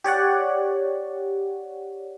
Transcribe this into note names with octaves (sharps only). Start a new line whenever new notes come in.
G4 C#5 D5 F#5